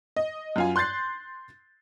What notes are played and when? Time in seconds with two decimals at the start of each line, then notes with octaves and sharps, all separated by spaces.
0.17 D#5
0.56 F#2 F4 G#5
0.76 C6 F#6 G6 A6 C7